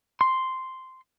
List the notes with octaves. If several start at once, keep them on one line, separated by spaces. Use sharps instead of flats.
C6